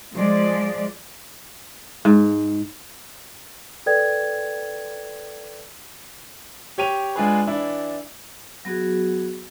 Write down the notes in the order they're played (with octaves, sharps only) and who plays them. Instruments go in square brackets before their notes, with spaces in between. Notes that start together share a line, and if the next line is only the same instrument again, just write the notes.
[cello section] F3 G#3 D5
[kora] G#2
[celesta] A4 B4 D5 G5 G#6
[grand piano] G4 C#5 G5 D#7 F7
G#3 D4 F4 G#4 B4
E3 D4 E4
[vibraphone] F#3 B3 F#4 G#4